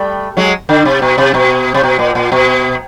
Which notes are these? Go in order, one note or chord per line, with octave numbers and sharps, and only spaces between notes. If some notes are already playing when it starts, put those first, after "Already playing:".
Already playing: G3 A3
F#3 G#3
D3
C3
B2
C3
B2
C3
B2
A#2
A#2
B2